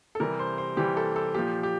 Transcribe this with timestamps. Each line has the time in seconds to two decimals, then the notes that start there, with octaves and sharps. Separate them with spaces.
0.15 A4
0.20 C3 E3 G3 A#4
0.39 C5
0.58 C5
0.77 C3 E3 G3 G4
0.97 A4
1.16 A4
1.34 A#2 F3 G4
1.63 G4